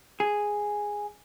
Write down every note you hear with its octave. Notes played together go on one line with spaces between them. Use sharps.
G#4